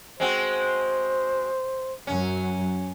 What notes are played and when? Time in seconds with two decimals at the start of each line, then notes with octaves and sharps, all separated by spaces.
0.20 G#3 C4 F#4 C5
2.07 F#2 F#3 C#4